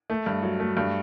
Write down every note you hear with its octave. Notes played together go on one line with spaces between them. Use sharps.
A3
G2
F#3
A3
G2